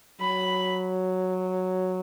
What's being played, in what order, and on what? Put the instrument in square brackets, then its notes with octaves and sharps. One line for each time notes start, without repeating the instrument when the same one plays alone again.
[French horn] F#3 [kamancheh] B5